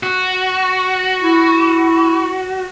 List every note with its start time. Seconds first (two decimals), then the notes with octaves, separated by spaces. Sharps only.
0.03 F#4
1.22 E4